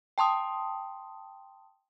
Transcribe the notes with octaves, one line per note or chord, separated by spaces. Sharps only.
G5 A5 C6 D#6